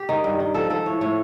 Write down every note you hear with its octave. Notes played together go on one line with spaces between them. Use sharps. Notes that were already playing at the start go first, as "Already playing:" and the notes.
Already playing: G4
D#3
G2
D#3
F3 A4
F3 A4
A2 C#5
A2 C#5